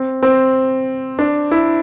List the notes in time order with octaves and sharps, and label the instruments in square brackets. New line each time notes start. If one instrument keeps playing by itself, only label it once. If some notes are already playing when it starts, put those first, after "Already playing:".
Already playing: [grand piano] C4
C4
D4
E4